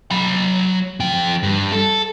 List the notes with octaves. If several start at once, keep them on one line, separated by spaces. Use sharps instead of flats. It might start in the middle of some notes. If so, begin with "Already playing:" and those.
F#3 B5
F3 G5
G2
A4